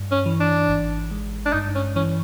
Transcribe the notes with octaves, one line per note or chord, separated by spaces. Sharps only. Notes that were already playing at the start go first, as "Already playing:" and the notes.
Already playing: G2
C#4
E3
D4
G#1
G#3
D4
G2 D#4
C#4
E3 C#4